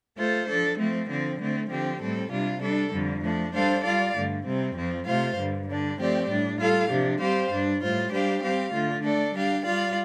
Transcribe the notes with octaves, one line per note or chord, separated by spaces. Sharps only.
A3 F4 A4 C5
F3 D4 A4
F3 A3 C4
D3 F3 C4
D3 A3 C4
D3 F3 C4 G4
A2 G3 C4 A4
C3 G3 D4 F4
G3 D4 A4
F2 D3 G3
F3 A3 D4
G3 D4 A4 C5 F5
G3 F4 D5 F5
G2 D3 A3
C3 G3 C4
F2 F3 C4
C3 A3 F4 C5 F5
G2 D3 G3
D3 G3 D4
F3 A3 C4 G4 D5
A2 G3 D4
G3 F4 A4 F5
C3 F3 D4 G4
G3 C4 G4 C5 F5
G2 G3 D4
A2 G3 F4 C5
G3 D4 G4 C5 F5
G3 C4 G4 F5
D3 A3 F4
A3 D4 A4 D5
G3 D4 G4 F5
G3 F4 D5 F5